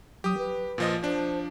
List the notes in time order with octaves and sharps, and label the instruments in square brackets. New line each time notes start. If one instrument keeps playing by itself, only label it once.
[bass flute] F#3 [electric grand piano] G4 D#6
[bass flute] B4
[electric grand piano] A#2 F3 D#5
[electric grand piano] F3 D4 [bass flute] C5